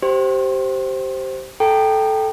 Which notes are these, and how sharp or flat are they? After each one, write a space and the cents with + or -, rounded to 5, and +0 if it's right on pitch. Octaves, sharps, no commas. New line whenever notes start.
G4 -20 C5 +0
A4 -10 G5 +0 A#5 -30